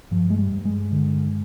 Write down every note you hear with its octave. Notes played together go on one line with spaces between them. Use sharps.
G2 F3
G#3
G3
G2
G#3
D3